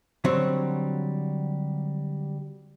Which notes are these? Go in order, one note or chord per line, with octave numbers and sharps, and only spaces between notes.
D3 F#3 G3 C4 C#5